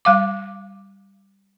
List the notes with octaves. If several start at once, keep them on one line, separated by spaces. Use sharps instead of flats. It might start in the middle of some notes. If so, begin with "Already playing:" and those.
G3 F5 D6